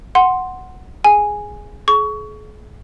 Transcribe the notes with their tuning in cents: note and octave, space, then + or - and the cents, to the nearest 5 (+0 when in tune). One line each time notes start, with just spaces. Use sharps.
F#5 +0 C6 +0
G#4 +0 G#5 +0
G#4 +40 C#6 +25